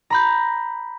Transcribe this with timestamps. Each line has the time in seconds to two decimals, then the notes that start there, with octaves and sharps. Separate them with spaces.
0.10 A#5 B5 G6